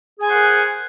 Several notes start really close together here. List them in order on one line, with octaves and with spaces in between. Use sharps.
G#4 G#5 C5 F#5 A#4